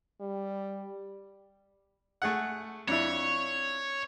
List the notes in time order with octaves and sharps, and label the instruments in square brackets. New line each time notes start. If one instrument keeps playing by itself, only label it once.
[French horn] G3
[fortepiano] A3 G#4 F#5
[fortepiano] F2 D4 E4 [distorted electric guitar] C#5